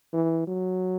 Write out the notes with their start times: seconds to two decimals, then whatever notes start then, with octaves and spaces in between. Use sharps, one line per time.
0.13 E3
0.47 F#3